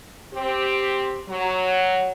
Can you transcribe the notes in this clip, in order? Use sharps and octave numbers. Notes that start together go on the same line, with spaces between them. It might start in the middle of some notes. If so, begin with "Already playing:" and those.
C4 G4
F#3